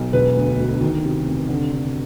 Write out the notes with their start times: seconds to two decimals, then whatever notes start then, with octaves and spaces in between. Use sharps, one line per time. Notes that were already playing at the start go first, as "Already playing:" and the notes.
Already playing: B1
0.13 E1 B4
0.35 D2
0.58 D2
0.81 D#3
1.05 C3
1.27 F1
1.49 D3
1.73 D3